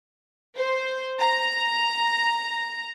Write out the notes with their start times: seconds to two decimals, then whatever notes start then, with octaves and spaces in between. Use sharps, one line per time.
0.56 C5
1.21 A#5